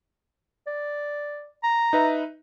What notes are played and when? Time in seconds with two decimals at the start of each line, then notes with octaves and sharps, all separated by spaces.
0.67 D5
1.63 A#5
1.93 D#4 B4 E5